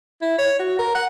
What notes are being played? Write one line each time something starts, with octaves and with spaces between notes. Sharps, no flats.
E4
C#5
F#4
A#4
F#5